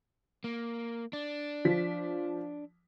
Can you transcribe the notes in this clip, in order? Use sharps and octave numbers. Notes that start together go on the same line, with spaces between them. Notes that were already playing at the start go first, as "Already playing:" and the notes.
A#3
D4
F3 B6